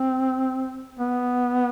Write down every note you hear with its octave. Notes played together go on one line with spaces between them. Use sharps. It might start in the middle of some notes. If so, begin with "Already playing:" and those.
Already playing: C4
B3